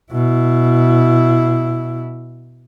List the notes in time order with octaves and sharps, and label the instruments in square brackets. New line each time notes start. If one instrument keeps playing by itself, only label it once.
[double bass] B2 E4